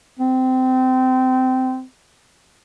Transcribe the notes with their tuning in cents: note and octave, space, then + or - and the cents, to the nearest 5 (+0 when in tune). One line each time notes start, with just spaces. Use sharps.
C4 -20